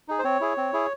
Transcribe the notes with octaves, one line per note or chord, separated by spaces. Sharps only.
D#4 G#4
C5
C4 C#5
E4 G#4
C4
E4 G#4